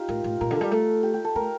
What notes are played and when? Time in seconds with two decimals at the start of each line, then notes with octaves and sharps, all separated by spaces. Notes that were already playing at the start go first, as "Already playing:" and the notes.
Already playing: D#4 F4 G4
0.09 A2 A#4
0.24 A2
0.40 A#2 A#4
0.50 D3
0.57 G3 A4
0.71 A3
1.03 G4
1.14 G4
1.25 A4
1.35 A3 A#4